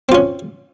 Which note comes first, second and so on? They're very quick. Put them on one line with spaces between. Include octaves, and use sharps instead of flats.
C4 F4 C#4